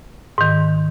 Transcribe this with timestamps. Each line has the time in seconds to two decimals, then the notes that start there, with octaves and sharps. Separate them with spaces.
0.38 G#2 D#3